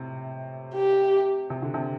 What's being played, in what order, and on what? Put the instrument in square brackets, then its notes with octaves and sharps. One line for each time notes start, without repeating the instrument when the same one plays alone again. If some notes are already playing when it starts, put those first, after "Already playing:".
Already playing: [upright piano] A2 C3
[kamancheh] G4
[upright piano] C3
D3
C3